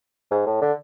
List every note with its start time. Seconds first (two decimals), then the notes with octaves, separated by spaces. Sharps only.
0.31 G#2
0.46 A2
0.61 D3